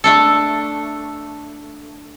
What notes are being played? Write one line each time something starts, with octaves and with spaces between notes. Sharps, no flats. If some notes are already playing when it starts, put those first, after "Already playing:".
A3 D4 A4